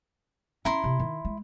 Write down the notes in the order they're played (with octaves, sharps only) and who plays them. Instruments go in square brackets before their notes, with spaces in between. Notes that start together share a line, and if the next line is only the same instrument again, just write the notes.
[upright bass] C#4 [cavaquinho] E4 A#5 C6
[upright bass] C3
D#3
G#3